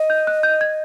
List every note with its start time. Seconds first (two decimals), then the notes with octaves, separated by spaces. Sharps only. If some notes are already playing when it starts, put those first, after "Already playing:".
Already playing: D#5
0.10 G6
0.27 F#6
0.43 G6
0.61 G#6